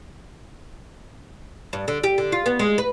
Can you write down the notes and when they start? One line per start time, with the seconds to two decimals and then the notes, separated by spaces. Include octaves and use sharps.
1.73 G2
1.88 D3
2.03 G4
2.18 D3
2.32 F4
2.46 B3
2.59 G#3
2.78 B4